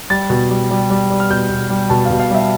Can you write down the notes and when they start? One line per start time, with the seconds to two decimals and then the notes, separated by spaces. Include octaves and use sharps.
0.10 G3 A6
0.30 B2
0.50 G3
0.71 G3
0.90 G3
1.10 G3
1.20 F6
1.30 B2 G6
1.50 B2
1.70 G3
1.90 B2 A5
2.06 B2 F5
2.20 F5
2.30 G3 E5